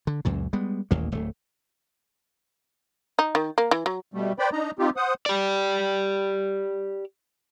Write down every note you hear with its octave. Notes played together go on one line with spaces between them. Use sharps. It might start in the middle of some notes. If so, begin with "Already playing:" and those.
D3
C#2 F#2 A#2
G3 G#3 B3
D#1 A1 D#2 A#3
D1 A3
D#4
D#3
A#3
E3
F#3
B2 G3 A3
B4 C5 D5 G5 B5
D4 D#4 D#5 A#5
C4 D#4 F4 G4
C5 F#5 D#6
G4 D5